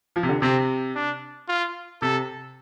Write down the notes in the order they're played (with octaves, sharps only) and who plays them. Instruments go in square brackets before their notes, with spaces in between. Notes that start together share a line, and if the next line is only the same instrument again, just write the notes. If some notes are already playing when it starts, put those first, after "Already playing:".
[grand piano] F3
C3
D3
[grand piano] C3 [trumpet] C4
[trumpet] D4
F4
[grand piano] C3 [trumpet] A4